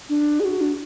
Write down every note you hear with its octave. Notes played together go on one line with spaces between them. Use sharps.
D4
G#4
F#4
D4